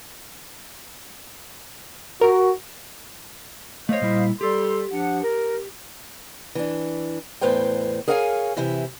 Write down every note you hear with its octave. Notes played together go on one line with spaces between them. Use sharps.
F#4 A#4
A3 C5 C#5 D#5 F5
A#2 G3 E4
G3 G4 A4 C6
F3 D4 F#5
A#4
E3 D4
E2 A2 B4 C5 G5
G#4 A#4 C#5 F5 G5 G#5
C3 E3 E4 G4